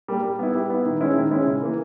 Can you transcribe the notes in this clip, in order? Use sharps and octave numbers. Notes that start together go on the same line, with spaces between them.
G3 A#3
G3
B3 E4
G3
B3 E4
D#3
G#3 C#4 E4
D#3
G#3 C#4 E4
C#3
E3 A#3